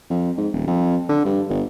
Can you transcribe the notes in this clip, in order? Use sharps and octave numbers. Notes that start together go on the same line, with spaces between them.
F2
G#2
D#1
F2
D3
G2
G1